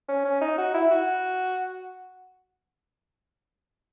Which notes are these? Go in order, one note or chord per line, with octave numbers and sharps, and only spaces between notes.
C#4
C#4
D#4
F#4
E4
F#4